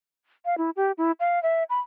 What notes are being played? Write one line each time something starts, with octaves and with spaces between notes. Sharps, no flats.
F5
E4
G4
E4
F5
E5
B5